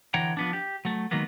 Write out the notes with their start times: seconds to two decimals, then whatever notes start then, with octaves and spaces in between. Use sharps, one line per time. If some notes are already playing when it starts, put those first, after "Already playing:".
0.14 D3 E3 C#5 F#5 G5 A#5
0.37 F3 B3 D4
0.53 G4
0.85 F#3 A3
1.11 D#3 F#3 G#3 A#3 B3